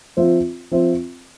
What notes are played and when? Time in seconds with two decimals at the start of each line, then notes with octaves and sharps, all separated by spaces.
0.17 F3 C4 F4 C5 E5
0.72 F3 C4 F4 C5 E5